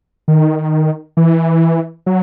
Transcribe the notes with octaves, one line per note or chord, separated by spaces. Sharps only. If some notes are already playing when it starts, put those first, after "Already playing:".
D#3
E3
F#3